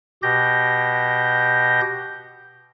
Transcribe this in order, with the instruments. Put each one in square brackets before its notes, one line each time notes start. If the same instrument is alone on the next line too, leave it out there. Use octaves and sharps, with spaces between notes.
[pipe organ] B2 G4 G6 A#6